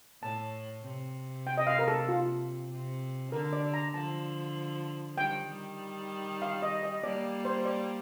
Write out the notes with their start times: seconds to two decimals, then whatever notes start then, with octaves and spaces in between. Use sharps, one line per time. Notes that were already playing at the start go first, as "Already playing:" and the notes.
0.22 A2 A5
0.85 C3
1.47 G5
1.58 D#5
1.67 F5
1.79 A#4
1.88 A4
2.09 F4
2.71 C3
3.32 D3 A#4
3.53 D5
3.74 A#5
3.94 D3 F3 A5
5.18 D#3 G3 G5
5.48 D#3 G3
6.42 F5
6.62 D#5
6.83 D#5
7.03 G3 A#3 D5
7.45 C5
7.65 D5